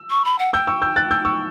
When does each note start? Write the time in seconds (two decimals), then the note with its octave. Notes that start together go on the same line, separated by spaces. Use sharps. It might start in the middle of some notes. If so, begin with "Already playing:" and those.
Already playing: E6
0.10 C#6
0.25 B5
0.39 F#5
0.53 G5 E6 G6
0.67 C#6 E6
0.82 E6 G6
0.96 F#6 A6
1.11 E6 G6
1.25 C#6 E6